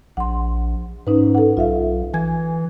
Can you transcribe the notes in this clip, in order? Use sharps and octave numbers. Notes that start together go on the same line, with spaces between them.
A#1 F#5 C6
G#2 C#4 D#4 B4
A4 F#5
B1 F4 E5 F5
E3 G#5 G#6